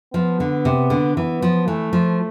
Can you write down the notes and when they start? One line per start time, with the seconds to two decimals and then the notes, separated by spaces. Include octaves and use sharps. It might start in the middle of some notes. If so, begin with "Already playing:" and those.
0.14 F3 B3
0.40 D3
0.65 C3
0.90 D3
1.16 E3 B3
1.42 F3
1.67 E3 A3
1.93 F3